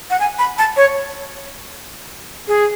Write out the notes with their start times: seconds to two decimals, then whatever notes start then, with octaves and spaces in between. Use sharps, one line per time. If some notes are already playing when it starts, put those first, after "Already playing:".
0.10 F#5
0.20 G#5
0.39 B5
0.58 A5
0.76 C#5
2.48 G#4